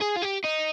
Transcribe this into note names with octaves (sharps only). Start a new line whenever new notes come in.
G#4
F4
G4
D#4